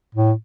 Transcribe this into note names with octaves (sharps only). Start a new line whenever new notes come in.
A2